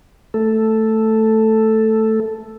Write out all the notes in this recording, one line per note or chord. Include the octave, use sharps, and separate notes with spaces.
A3 A4